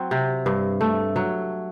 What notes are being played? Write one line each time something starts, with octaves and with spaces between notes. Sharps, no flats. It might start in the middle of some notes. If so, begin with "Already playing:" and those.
Already playing: F#3 C4
C3
G2
A3
F#3